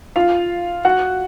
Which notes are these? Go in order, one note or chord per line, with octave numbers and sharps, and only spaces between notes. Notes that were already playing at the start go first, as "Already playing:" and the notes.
F4 F5
F#4 F#5